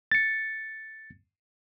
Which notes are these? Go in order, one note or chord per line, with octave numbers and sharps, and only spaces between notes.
A6 C#7